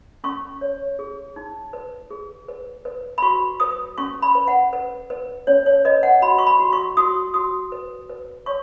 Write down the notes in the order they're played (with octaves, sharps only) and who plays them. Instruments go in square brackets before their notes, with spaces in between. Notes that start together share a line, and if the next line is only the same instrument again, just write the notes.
[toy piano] C#4 C#6
C#5
G#4
D#4
B4
G#4
B4
B4
B5
F#4 C#6
B4 D#6
C#4 C#6
B5
B4
F#5
B4
B4
C#4 C#5
C#5
B4 D#5
F#5
F#4 B5
C#6
B5
F#4
C#6
F#4 D#6
F#4 D#6
B4
B4
C#5 C#6